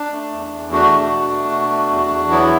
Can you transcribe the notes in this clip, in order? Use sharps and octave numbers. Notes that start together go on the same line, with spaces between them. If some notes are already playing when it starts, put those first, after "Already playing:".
Already playing: D4
A3
E2
E2
A3 D4 F#4
B2
B2
A3
B2
A3
E2
E2
F#3 B3 E4